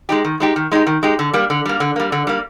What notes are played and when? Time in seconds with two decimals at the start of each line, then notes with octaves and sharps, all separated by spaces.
0.09 G#3 D#4 G4
0.24 D#3
0.40 G#3 D#4 G4
0.56 D#3
0.71 G#3 D#4 G4
0.87 D#3
1.03 G#3 D#4 G4
1.19 D3
1.33 G3 A#3
1.50 D3
1.65 G3 A#3
1.80 D3
1.96 G3 A#3
2.12 D3
2.27 G3 A#3